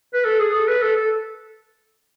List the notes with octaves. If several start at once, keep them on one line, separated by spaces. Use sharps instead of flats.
B4
A4
G#4
A4
B4
A4
A4